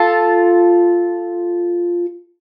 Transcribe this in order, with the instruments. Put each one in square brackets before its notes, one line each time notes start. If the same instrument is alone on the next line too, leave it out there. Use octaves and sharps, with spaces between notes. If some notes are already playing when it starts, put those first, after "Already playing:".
Already playing: [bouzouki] F4 A4